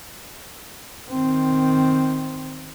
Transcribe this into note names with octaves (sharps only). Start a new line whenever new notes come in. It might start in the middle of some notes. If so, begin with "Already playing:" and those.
D#3 C4